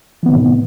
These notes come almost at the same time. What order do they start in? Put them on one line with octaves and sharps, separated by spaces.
E3 B3 D#3 C3 A2